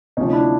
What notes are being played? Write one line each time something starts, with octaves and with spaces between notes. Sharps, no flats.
D2 C3 F3 C#4 D#4
D4 E4